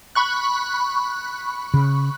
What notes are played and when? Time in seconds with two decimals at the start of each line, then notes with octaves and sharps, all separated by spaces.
0.15 B5 C#6 F#6
1.74 C#3